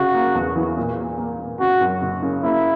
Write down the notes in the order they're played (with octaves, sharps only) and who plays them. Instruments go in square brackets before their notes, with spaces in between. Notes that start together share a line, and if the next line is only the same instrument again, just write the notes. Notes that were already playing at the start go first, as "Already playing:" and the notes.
Already playing: [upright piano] C#3 [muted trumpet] F#4
[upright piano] A#3
E2
E3
A#2
A#3
A#3
A#2
[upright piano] C#3 [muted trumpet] F#4
[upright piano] F#2
F#1
C#3
[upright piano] A#3 [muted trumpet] E4